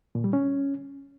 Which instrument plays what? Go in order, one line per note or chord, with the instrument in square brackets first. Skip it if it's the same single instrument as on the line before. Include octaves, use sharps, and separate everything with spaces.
[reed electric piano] A#2
G3
C#4